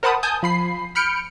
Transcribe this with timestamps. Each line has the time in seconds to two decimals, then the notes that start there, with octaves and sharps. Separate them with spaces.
0.03 A#4 C5 F#5 A5 B5 D#6
0.23 G#5 A5 D#6 G6
0.43 F3 B5 C7
0.95 B5 F6 G6 C#7 D7